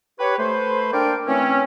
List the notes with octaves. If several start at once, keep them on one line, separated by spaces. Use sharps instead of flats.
G4 B4 C#5
A3 B4 C5
A#3 D4 A#4 C5 D5 G5
E3 A3 C4 C#4